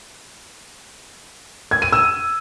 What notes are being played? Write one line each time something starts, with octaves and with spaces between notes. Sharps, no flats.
G#6
D#7
E6